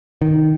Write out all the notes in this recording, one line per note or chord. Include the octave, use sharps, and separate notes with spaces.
D#3